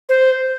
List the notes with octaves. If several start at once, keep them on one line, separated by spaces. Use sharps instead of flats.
C5